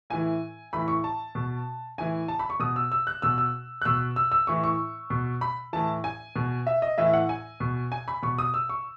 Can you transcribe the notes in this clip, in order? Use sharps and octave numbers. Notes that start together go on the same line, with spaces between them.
A2 E3 G#5
A2 E3 B5
C#6
A5
B2
A2 E3 G#5
A5
B5
C#6
B2 D#6
E6
E6
F#6
B2 E6
E6
F#6
B2 E6
E6
E6
A2 E3 C#6
C#6
B2
B5
A2 E3 A5
G#5
B2
E5
D#5
A2 E3 E5
F#5
G#5
B2
G#5
B5
B2 C#6
D#6
E6
C#6